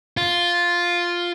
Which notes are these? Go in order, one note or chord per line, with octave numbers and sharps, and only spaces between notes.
F4